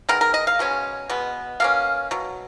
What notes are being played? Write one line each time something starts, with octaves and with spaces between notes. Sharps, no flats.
D#3 G#3 B3 A#4
A#4
D#5
F5
B2 G#3 C#4
B2 G#3 B3
B2 A#3 C#4 F5
B2 F#3